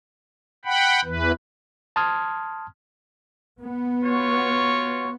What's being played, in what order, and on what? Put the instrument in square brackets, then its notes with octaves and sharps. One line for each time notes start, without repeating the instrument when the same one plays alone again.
[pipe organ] F#5 G5 B5
E2 E3 B4
[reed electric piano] A5 C6 D#6 F6 G#6
[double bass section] B3
[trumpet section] F4 F#4 C#5